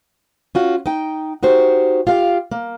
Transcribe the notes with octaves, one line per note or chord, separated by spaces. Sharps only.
C#4 F4 F#4
D#4 G5
D#4 F#4 G4 C5
F4 G4 F5
A#3